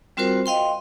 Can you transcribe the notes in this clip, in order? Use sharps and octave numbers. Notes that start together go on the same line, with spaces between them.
G3 C4 F4 F#4 A#4 C5
D#5 F5 G5 C6